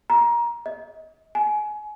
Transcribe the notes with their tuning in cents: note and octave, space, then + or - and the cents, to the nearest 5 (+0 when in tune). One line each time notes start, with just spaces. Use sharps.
A#5 +20
D#5 +30
G#5 +25